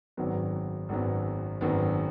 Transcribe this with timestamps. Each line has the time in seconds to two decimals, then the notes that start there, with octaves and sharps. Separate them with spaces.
0.17 G#1 F#2 D#3 F#3 B3
0.89 G#1 F#2 D#3 F#3 B3
1.61 G#1 F#2 D#3 F#3 B3